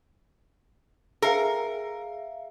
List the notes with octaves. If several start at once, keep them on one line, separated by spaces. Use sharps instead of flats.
G#4 A#4 E5 F5